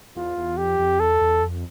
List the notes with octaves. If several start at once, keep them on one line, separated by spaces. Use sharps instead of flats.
E2 F4
E2
F2 G4
F2
E2 A4
E2
F2